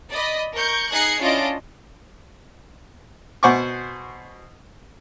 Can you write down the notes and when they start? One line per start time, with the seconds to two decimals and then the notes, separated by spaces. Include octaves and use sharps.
0.10 D5 D#5 B5
0.53 A#4 C#6 G6
0.91 D#4 G#4 F#6 G#6 C7 C#7
1.21 C#4 D4 E4 F4 D#5 D7
3.43 B2 C5 F#5 G#5 C#6 D6